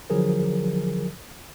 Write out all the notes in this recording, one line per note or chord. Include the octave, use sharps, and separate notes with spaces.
D3 F3 F#3 G#4 A#4